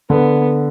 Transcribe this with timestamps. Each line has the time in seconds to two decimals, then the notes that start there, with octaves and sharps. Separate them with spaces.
0.10 D3 B3